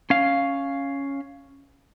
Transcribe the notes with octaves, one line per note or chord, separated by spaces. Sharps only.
C#4 F5